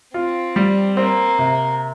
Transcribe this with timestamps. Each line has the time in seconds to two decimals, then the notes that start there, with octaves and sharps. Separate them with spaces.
0.14 C4 F4
0.56 G3
0.97 A#3 C4
1.39 C3